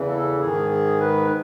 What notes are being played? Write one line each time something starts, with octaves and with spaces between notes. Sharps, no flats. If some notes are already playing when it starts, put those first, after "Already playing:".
Already playing: E2 C#3 E3
A4
G#2 D#3 G#4
G#4
B4